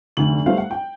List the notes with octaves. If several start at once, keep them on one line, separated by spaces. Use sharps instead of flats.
F1 D2 D3 F#7
G3 A3 B3 B4 C5 F5
F#5
G5